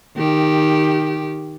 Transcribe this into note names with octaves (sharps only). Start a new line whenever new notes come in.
D#3 G4